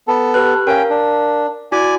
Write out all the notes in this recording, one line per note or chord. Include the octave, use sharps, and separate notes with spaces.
B3 A4
G4 B4 F#6
C#4 A#4 F5 G5
D4
E4 F#4 D5 G#5